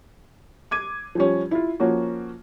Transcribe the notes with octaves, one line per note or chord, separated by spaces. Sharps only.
D6 G#6 D#7
F3 G3 C#4
E4 F4
F3 A#3 C#4 F#4